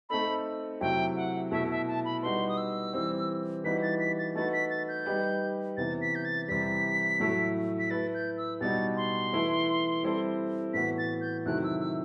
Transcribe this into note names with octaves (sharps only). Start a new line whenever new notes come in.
A3 C4 D#4 A4 B5
C3 F#3 A3 E4 G4 G5
F#5
B2 A3 E4 A4 E5
E5
A5
B5
G3 D#4 F#4 B4 C6
D#6
E6
E3 G3 C4
E3 G3 D#4 F#4 B4 B6
A6
B6
A6
A3 D#4 F#4 B4 A6
B6
A6
G6
G3 D#4 G4 B4
C3 E3 B3 A6
B6
G6
A6
C3 E3 G3 B6
A2 F#3 A3 E4
B6
A3 E4 B4 A6
G6
E6
B2 G3 D#4 F#4 A6
C6
E3 A3 E4 B4
G3 C4 E4 A4
A2 E3 B3 F#4 B6
A6
G6
C3 D#3 F#3 A3 E4 F#6
E6
E6